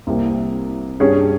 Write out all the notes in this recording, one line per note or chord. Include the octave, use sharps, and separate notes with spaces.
C2 C3 G3 A#3
G2 G3 C#4 G#4 C#5